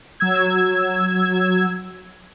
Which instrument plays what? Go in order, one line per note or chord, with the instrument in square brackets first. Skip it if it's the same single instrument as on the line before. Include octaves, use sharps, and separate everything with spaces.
[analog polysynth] F#3 E6 G#6